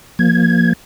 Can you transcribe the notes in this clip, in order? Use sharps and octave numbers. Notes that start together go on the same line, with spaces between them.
F3 A#3 G#6